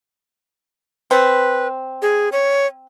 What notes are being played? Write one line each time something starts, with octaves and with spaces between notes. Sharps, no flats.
C4 B4
G#4
C#5